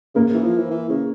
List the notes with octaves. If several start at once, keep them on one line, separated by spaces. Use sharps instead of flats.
C#3 A#3
E3
F3
E3
E3
C#3